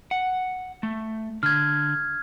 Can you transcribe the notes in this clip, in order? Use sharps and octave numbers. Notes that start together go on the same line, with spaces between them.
F#5
A3
D3 F6 G#6